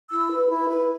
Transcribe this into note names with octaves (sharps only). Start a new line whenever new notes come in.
E4 E6
B4
E4
B4